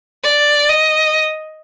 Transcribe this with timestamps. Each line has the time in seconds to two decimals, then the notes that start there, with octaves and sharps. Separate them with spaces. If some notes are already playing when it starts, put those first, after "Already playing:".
0.24 D5
0.69 D#5